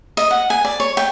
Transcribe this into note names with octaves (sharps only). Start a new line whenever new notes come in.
D#5
F#5
G#5
D5
C#5
G5